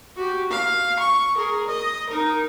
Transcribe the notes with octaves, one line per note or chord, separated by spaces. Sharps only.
F#4 G4
F5
C#6
G#4 A#4
D#5
D#4 A#4